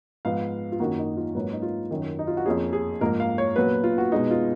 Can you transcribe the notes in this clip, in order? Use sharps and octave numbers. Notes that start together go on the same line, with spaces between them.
G#2 F3 B3 F5
F4
F#2 D#3 A#3 F#4
D#4
F4
G#2 F#3 A#3 C#4 B4
D#4
F4
F#2 D#3 F#3
D#4
F4
F#4
F2 F3 A#3 C#4 G#4
G#4
G#2 F3 A#3 A#4
F5
C#5
A#2 F#3 B3 B4
F4
F#4
B2 G#3 B3 D#4
F4